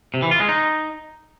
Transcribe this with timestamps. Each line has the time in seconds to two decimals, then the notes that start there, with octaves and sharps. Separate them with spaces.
0.14 C3
0.22 E3
0.31 F4
0.40 G#3
0.49 D#4